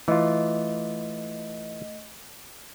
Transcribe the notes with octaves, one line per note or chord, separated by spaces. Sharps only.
E3 A3 F4 D#5